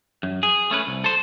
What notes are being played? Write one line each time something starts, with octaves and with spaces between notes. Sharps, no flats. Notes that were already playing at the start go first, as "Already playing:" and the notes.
F#2
G#4
A3 C#4 B4
C2
A4 C5